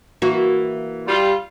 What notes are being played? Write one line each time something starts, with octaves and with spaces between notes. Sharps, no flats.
E3 A#3 F#4
G3 F4